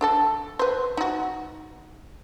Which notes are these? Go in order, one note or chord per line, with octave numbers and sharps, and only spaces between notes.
D4 A4 A5
B4 C5
D#4 F#4